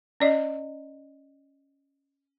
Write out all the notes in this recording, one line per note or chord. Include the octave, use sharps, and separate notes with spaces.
C#4 D5 D#5